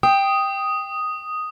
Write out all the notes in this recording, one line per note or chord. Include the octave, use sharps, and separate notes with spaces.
G5 D#6